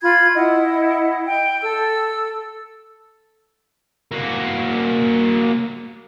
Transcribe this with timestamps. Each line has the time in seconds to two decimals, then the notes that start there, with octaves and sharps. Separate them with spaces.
0.02 F4 B5 G#6
0.35 E4 D#5 F#5
1.27 G5
1.62 A4 E6
4.11 A#3 F#4